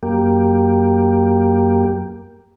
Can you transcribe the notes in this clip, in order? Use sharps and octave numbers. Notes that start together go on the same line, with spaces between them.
F#2 A#3 G4